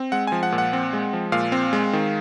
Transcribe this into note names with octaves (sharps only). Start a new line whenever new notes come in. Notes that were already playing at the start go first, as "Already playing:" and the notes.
Already playing: C4
G#3 F#5
F3 G#5
F#5
A#2
F#5
C4
G#3
F3
A#2 F5
C4
G#3
D#3